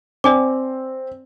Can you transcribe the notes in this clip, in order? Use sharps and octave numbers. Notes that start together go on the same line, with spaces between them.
C4 D5 G#5 D6